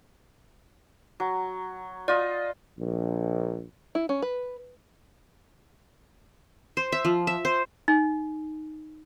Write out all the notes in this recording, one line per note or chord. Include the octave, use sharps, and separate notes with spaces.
F#3
F4 D5 D#5
A#1
E4
C#4
B4
C5
E5
F3
E5
C5
D#4